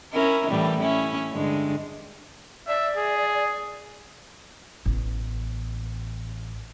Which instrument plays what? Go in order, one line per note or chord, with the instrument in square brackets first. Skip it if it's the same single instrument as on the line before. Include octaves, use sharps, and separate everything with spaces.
[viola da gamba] C#4 E4 A#4
A2 E3 G3
C#4 E4
G2 D3 G#3
[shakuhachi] D5 [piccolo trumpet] E5
[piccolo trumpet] G#4
[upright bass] A1 B3